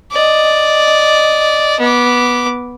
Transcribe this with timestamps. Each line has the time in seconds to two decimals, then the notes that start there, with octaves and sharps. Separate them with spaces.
0.11 D5 D#5
1.80 B3 D6